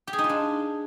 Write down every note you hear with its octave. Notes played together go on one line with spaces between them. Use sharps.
G4
G#4
D#4
F4
D4